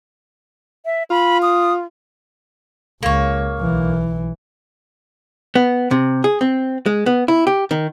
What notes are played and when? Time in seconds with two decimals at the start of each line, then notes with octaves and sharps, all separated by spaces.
0.86 E5
1.11 F4 B5
1.42 D#6
3.03 C#2 A#3 C#5
3.60 B1 E3
5.55 B3
5.91 C3
6.24 G#4
6.41 C4
6.86 G#3
7.06 B3
7.28 E4
7.47 G4
7.71 D#3